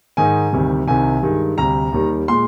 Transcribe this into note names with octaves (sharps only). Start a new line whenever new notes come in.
G#2 D#3 G#3 G#5
D2 C3 D#3 G3
C2 C3 D#3 G#5
G2 D#3 G#3
D2 C3 G3 A#5
D#2 D#3 G3
A#2 G#3 C6